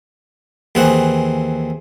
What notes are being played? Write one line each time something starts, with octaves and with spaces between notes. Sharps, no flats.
D#2 E3 C4 G#4 F#5